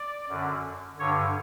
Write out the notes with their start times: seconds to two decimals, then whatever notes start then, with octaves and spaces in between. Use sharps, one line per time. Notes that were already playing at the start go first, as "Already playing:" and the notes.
Already playing: D5
0.29 F#2 D3
0.99 G2 D3 C#5